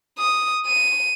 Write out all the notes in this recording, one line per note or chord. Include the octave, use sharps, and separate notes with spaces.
D#6
D#7